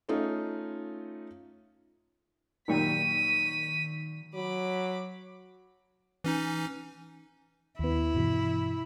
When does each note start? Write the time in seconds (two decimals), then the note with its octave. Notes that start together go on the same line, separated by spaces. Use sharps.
0.09 A3 C#4 D#4 F4
2.68 F#2 A#2 D#3 G3 C#6 B6 D#7
4.34 F#3 B5 D6
6.24 E3 C#4 D#4
7.79 D#2 B3 E4
8.14 G2 B2 E3